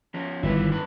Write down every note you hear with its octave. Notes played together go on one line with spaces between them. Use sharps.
F3 C#4
G1 D#3 E4 F4 B4
F#2 B4